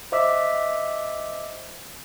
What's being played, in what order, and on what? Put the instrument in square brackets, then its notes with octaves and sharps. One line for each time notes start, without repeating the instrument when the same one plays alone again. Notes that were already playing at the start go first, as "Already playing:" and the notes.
[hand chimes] C5 D#5 E5 D6 E6 B6